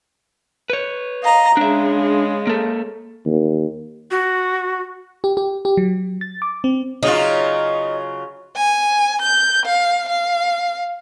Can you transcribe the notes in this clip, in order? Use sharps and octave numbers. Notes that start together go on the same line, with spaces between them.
B4 C#5
D#5 F5 A#5
C#3 G#3 D4 E5
A#3 A4
D#2
F#4
G4
G4
G4
F#3
A6
D6
C4
C#3 F#3 D#4 F4
G#5
G6
F5
F5